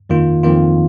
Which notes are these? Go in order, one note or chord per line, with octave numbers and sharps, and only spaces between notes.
F2 D#3 A#3 F4
F2 D#3 A#3 F4